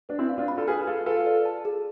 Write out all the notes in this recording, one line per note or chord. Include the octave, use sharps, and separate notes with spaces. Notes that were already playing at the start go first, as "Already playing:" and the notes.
D4 B4
C4 E4
F5
D4 F4
B5
F4 A4
G#4 B4 F6
F4 G#4 A4
F4 A4 B4
D5
A5
G#4